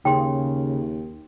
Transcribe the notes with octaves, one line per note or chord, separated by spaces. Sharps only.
D#2 C#3 G5 C6